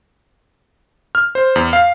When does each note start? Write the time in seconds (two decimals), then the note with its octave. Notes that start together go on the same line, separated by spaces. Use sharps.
1.15 F6
1.35 C5
1.56 E2
1.73 F5